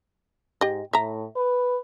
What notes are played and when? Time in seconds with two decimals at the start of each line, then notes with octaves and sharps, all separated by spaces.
0.61 G#2 G4 D#5
0.93 A2 E5 A#5
1.36 B4